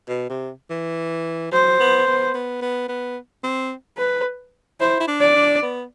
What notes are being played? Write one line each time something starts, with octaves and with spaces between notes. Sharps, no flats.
B2
C3
E3
F#3 C5
B3
B3
B3
B3
B3
C4
B4
E4 C5
E4
D4
D5
D4
B3